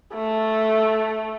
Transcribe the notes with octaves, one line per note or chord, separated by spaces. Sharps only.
A3